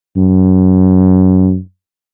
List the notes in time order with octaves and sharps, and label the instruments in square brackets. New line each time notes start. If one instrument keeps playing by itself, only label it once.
[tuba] F#2